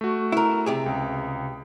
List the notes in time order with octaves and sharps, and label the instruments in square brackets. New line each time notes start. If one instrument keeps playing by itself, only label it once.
[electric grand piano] A3 F#4
[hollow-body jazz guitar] E4 A#4
C3 G4 G#4
[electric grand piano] C#2